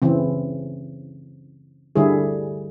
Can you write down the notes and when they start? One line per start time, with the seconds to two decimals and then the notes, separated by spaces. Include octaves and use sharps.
0.02 C#3 E3 C4
1.96 D3 G3 E4 G#4